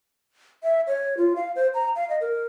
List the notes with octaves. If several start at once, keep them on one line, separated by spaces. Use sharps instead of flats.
E5
C#5
F4
F5
C5
A#5
F5
D#5
A#4